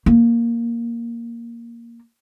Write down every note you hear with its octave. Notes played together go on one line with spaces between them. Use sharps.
A#3